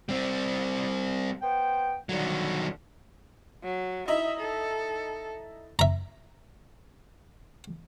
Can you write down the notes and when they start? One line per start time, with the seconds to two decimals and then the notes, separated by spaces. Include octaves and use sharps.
0.09 G3 C4
1.42 B3 C5 G5
2.09 D3 D#3 F#3 G3
3.64 F#3
4.08 D#4 E4 D#5 E5
4.39 A4
5.79 E5 A#5